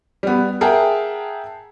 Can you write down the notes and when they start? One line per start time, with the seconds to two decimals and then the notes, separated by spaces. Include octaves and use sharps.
0.23 G3 B3
0.61 G#4 A#4 E5 F#5 G5 A5